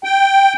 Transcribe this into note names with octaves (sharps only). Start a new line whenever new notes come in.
G5